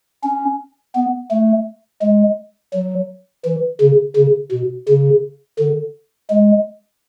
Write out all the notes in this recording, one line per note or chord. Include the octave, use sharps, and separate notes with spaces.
C#4
B3
A3
G#3
F#3
E3
C#3
C#3
B2
C#3
D3
G#3